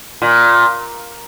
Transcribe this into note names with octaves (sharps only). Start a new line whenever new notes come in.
A#2